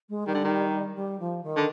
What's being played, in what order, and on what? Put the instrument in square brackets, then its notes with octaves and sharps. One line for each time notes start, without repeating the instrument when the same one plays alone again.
[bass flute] G#3
[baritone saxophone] D#3 [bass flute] G3
[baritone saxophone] D3
D#3
[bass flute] G3
F3
D#3
[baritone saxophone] D3